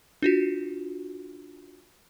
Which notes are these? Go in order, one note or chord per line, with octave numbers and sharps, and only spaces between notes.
D4 F4 F#4